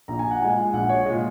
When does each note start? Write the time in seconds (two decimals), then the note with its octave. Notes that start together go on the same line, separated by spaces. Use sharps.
0.08 A#1 A#5
0.19 G#5
0.31 F#5
0.40 A#2 G#3 G#5
0.73 A#1 F#5
0.89 C#5
1.05 A#2 G#3 D#5